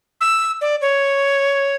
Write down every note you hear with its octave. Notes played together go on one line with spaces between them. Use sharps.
E6
D5
C#5